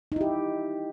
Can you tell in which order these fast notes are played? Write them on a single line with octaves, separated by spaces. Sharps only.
D#4 E4 G4